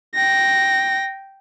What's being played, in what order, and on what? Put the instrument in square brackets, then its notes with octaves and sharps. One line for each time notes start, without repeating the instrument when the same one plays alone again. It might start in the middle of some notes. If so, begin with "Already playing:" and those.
[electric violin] G5 A#6